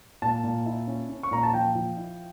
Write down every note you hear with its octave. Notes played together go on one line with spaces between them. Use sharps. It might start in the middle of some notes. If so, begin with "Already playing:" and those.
A#2 A5
A#2
E4
C#4
C#4
C#6
A#2 A#5
A5
F3 G5
F3
E4